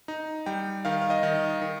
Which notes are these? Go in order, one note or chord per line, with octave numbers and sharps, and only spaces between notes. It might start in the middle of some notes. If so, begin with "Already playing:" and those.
D#4
G3 G5
D#3 F5
F5
D#5
D#3
D#3